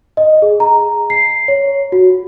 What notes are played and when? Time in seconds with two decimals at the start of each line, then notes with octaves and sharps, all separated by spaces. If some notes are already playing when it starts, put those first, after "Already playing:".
0.17 D#5
0.42 G#4
0.60 A#5
1.10 C7
1.48 C#5
1.92 F#4